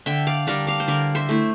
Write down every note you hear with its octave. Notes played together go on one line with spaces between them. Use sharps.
D3 E5 G5
D5 F5
G3 D4 A#4 D5
D5 F5
C5
D3 A#4 D5
C5 E5
A3 E4